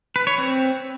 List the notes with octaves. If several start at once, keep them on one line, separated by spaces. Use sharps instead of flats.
B4
C#5
C4